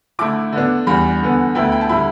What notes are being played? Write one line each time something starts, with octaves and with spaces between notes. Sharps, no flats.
D3 A3 E4 D6
D3 B3 D4
E2 E3 G3 B5
E2 D3 B3
D2 D3 B3 E4 G5
G5
A5
D3 G3 E4 B5